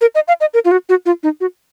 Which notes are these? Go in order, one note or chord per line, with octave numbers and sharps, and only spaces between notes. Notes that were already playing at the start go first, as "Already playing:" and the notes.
A#4
D#5
F5
D#5
A#4
F4
F#4
F#4
F4
D#4
F#4